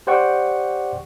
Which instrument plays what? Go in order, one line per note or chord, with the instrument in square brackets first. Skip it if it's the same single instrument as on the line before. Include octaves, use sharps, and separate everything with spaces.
[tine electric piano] G4 C5 D5 F#5 G5 C#6